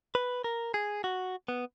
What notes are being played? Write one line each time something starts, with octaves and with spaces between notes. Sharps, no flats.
B4
A#4
G#4
F#4
B3